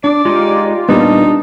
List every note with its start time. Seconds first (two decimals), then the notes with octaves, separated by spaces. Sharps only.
0.04 D4 D5 D6
0.25 G#3 D#4 F4 G4
0.89 A#2 G3 B3 D4 D#4 A5